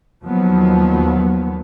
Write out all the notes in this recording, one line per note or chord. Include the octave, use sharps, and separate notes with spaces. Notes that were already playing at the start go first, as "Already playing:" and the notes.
D#2 F3 F#3 B3